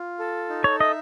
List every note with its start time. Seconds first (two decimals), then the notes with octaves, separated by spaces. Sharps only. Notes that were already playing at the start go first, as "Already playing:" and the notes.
Already playing: F4
0.19 A4
0.49 D#4
0.64 C#5
0.80 D#5 E5